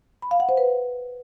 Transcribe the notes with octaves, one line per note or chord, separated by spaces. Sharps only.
B5
F5
F#5
C5
B4